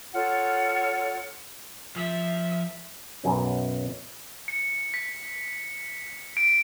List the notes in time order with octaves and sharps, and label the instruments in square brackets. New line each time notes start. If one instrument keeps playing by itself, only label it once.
[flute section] F4 A4 C#5 F#5
[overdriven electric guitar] F3 [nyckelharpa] E5
[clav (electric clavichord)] B1 F#2 C#4
[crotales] C#7
B6
D7